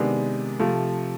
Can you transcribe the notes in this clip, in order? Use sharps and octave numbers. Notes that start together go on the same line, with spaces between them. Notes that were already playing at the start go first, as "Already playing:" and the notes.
Already playing: C3 D#3 G#3 B3 D4
C3 F3 A3